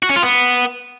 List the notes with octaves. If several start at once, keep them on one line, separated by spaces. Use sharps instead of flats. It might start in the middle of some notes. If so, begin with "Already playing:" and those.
F#4
C#4
F4
B3